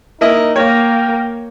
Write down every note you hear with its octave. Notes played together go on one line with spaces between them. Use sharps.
A#3 D#4 E4 D#5
A#3 A#4 C#5 G5